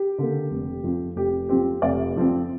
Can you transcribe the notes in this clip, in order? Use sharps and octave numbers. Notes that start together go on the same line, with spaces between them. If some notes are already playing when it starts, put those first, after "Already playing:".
Already playing: G4
D3 A#3
F1
F2 F3 C4
F1 G4
F2 F3 C4 G4
F1 D5
F2 F3 C4